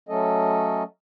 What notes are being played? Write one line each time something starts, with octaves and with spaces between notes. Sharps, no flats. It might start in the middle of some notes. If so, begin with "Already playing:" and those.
F#3 A3 C#4 A4 D#5